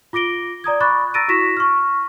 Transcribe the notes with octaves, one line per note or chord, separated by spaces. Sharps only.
F4 D6 A#6 D7 G7
D5 A#5 D#6 G#6
B5 C#6 D6 F#6 A6
A#5 E6 A6 A#6 D7 D#7
E4 F#4 C#6 A#6 B6 E7
C#6 F6